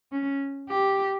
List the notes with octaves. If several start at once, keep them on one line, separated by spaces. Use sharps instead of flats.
C#4
G4